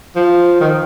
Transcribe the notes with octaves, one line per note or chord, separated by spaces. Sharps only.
F3
D#3